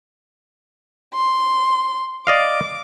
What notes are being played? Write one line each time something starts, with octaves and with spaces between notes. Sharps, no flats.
C6
D5 D#5 F5 D6